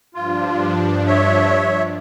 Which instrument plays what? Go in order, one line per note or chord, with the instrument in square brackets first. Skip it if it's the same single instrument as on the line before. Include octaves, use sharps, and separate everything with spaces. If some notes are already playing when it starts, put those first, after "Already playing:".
[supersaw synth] G2 F3 D4 [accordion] F4
[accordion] C#5 E5